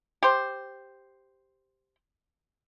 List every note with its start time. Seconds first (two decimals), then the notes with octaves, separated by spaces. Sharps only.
0.23 G4 C5